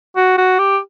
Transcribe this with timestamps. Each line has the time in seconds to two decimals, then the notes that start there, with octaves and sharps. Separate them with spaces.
0.16 F#4
0.38 F#4
0.59 G4